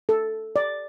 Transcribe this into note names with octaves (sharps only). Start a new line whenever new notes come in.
A4
D5